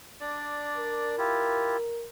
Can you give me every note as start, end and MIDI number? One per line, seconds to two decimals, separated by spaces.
0.21 1.16 62
0.21 1.16 74
0.77 2.09 70
1.18 1.77 64
1.18 1.77 65
1.18 1.77 67